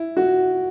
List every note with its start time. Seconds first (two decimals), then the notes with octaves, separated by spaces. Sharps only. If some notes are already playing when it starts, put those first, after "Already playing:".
Already playing: E4
0.17 F#4